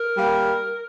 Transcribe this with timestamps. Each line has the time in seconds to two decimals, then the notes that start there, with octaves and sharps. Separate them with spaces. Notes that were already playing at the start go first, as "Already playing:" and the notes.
Already playing: A#4
0.16 G3 A#3